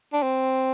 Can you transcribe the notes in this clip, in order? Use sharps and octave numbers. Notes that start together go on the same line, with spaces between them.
D4
C4